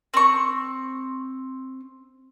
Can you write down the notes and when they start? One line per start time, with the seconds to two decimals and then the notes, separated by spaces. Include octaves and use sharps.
0.14 C4 C#6